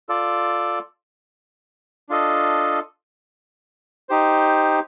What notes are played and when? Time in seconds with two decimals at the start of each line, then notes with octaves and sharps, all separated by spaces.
0.09 F4 A4 D5
2.09 D4 F4 A4 D#5
4.09 D#4 G4 C5